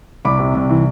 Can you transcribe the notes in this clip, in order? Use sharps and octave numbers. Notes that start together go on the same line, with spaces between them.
C2 B5 D6
C3
C2
E3